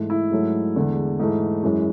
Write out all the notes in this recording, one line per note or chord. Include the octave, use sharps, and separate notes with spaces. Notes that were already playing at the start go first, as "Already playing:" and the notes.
Already playing: G#2 E3 A3
E4
G#2 F#3 A3
E2 D3 G#3
G#2 E3 A3
F#2 E3 G#3